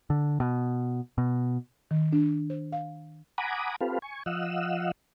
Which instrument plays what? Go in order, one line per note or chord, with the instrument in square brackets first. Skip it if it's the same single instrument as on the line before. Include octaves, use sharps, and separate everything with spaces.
[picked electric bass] D3
B2
B2
[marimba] D#3
D4
C5
F5
[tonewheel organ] F#5 G#5 A#5 B5 D6 D#6
C4 F4 G4 A4 B4 F5
G#5 C#6
F3 D#5 F5 F#5 E6